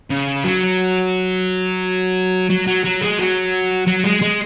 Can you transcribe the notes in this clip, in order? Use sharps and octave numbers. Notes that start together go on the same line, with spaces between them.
C#3
F#3
F#3
F#3
F#3
G#3
F#3
F#3
G#3
G#3